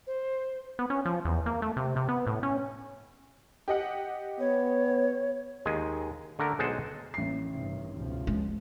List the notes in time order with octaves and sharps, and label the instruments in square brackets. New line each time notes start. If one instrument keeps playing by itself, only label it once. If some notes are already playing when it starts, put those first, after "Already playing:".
[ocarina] C5
[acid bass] B3
C#4
F3
E2
A#3
A3
C3
C3
B3
A2
C#4
[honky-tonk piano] G4 D#5 F#5
[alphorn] B3 [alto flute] C#5
[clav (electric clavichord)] D#2 G#3 G#5
D3 A3 A#4 A#5
B1 G#3 C5 F#5 G#5 A5
[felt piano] A1 C7 [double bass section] A#3
[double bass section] G2 C3 D#3
C#2 B2 F3
[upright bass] G#3